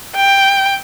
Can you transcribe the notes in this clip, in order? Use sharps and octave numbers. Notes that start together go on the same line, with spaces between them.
G5